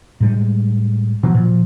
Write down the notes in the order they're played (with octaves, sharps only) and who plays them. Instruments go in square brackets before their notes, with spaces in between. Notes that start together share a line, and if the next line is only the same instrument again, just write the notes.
[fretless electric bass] A2 G3 G#3
[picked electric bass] B2 F3 F#3
[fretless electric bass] A#2 [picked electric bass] F3